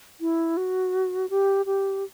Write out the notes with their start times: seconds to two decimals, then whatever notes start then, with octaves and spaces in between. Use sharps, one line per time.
0.21 E4
0.57 F#4
1.30 G4
1.66 G4